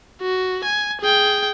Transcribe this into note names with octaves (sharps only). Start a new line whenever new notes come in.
F#4
G#5
G#4 G5